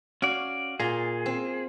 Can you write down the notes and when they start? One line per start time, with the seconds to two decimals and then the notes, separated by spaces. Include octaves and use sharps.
0.22 C#4 F#4 D5 F5
0.80 A#2 F4 G#4 A#5
1.26 C4